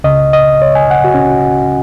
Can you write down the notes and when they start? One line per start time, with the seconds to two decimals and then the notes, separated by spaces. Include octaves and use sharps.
0.04 C#2 C#3 D#5
0.33 D#5
0.62 C#5
0.75 G#5
0.91 F#5
1.04 F#4
1.14 C#4